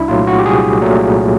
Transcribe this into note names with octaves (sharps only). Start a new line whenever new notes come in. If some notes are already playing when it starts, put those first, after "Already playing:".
Already playing: C2 D4 E4
A#2 F#3 A3 F4
F#4
G4
C2 G#4
A#2 F#3 A3